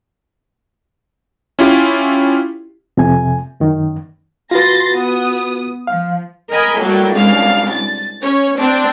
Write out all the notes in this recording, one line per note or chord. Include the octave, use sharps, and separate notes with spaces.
C#4 E4 F4 G4
F2 C3 G#5
F#2 D#3
F4 F#4 B4 C6 A6 A#6
B3 D#6
F3 F5
A#4 D#5 G#5 B5
A2 F#3 G3 A#3
C2 F#2 G#3 D4 F5
A6
C#4 C#5
C4 D4